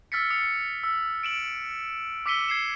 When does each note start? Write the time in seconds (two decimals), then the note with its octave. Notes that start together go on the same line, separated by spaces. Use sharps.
0.12 E6 F6 A6 B6 C#7
0.30 D#6 C#7
0.83 E6
1.23 D7 E7 F#7
2.26 D6 E6 B6 C#7 D#7 G7
2.48 G#6 C7 E7